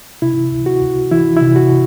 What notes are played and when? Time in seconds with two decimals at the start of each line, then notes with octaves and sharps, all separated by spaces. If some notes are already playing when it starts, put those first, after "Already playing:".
0.22 C3 E4
0.52 C#2
0.66 F#4
0.81 C#2
1.11 E3 E4
1.37 E4
1.41 C3
1.56 F#4